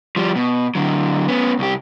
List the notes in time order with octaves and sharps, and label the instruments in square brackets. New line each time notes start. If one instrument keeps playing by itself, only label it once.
[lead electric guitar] F3 G3
B2
D3 F#3
B3 C#4
C2 G4